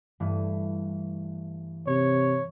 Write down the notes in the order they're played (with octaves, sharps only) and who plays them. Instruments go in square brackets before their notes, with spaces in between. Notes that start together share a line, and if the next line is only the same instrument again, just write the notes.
[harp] G2 E3 A3
[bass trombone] C3 [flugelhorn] C#5